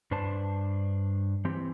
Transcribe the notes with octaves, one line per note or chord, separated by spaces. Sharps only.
G2 D4 B4 C5 A5
E3 C4 G4